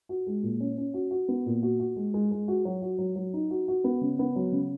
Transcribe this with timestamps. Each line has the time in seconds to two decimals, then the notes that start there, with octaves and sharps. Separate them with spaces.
0.09 F#4
0.27 G#3
0.43 A#2
0.60 C#4
0.78 C#4
0.94 F#4
1.11 F#4
1.28 B3
1.46 A#2
1.63 F#4
1.80 F#4
1.96 G#3
2.14 G#3
2.31 G#3
2.48 F#4
2.65 F#3
2.82 F#4
2.99 F#3
3.16 F#3
3.34 D#4
3.50 F#4
3.68 F#4
3.84 B3
4.01 C#3
4.19 B3
4.36 F#3
4.52 C#3